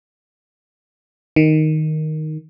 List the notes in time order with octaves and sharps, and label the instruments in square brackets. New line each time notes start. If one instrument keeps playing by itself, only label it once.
[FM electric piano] D#3